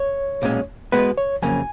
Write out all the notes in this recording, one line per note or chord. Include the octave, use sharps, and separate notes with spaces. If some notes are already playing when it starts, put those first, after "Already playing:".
Already playing: C#5
B1 A#2 G#3 C#4
B1 B2 G#3 B3 B4
C#5
F2 C#3 F#3 A#3 C#4 G#5